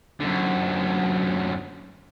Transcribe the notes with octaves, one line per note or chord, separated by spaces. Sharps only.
F#2 D3